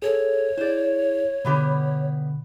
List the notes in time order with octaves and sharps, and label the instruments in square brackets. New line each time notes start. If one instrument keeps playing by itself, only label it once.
[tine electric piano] G#4 A4 [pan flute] C#5
[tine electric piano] E4 G#4 [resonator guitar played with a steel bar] C5 D5
[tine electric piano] B2 D3 [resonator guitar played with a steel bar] G3 B3 G4